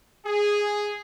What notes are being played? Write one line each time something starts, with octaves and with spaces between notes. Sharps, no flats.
G#4